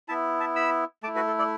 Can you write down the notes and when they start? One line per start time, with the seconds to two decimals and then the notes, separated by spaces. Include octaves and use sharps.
0.08 B3 E4 E5 A5
0.40 E5 A5
0.56 B5 E6
1.03 A3 A5 D6
1.07 E4
1.15 F#4 B4
1.27 A4
1.39 A4 D5